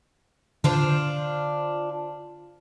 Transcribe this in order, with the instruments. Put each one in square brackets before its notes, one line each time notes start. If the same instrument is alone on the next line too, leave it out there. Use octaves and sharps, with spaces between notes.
[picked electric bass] D3 [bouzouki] D4 F4 C5